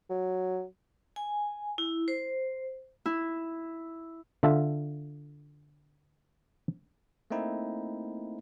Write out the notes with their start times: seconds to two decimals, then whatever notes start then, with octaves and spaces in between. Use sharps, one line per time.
0.10 F#3
1.16 G#5
1.78 E4
2.08 C5
3.06 E4
4.43 D3 F4 E5 A5
7.31 A3 A#3 C4 D#4 E4